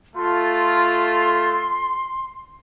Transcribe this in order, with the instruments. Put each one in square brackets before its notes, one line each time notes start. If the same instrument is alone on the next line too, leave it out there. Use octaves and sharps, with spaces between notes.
[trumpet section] A3 F4 A4 [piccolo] C6